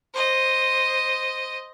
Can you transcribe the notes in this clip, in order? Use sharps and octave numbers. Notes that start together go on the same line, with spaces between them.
C5 D#5